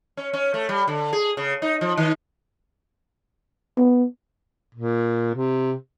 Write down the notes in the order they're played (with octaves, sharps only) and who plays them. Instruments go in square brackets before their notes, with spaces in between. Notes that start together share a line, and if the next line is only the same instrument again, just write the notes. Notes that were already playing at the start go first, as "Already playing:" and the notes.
[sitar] C#4
C#4
A3
G3
D3
G#4
C#3
D#4
F3
D#3
[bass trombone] B3
[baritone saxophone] A#2
C3